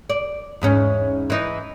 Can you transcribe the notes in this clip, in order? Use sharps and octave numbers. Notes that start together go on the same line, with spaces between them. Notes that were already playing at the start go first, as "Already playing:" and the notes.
D5
E2 G#2 C#4
E3 D#4